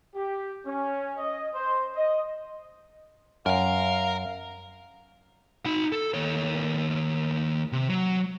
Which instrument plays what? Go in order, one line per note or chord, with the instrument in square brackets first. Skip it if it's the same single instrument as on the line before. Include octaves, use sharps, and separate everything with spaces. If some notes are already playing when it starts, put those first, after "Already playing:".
[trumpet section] G4
C#4
D#5
C5
D#5
[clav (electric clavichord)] F#2 [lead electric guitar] A#4 A#5 [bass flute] F5
[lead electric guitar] D#4 B5
A4
D#2 C#5
C3
F#3